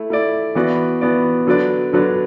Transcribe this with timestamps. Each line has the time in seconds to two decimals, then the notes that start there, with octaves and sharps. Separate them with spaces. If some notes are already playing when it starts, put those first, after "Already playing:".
Already playing: A3 E4
0.10 A3 E4 D5
0.55 E3 B3 F#4 D5
1.01 E3 B3 F#4 D5
1.47 D3 F#3 D4 B4 D5
1.93 D3 F#3 D4 B4 D5